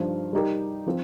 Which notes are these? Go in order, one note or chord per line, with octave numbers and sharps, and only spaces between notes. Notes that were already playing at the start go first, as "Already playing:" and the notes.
Already playing: G2 F3 D#4 C5
G3 D#4 G4 A#4
F3 C4 F4